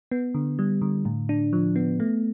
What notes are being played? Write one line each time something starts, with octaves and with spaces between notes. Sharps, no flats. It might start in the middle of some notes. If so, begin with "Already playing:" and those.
B3
D3
G3
D3
A2
D4
F3
B3
A3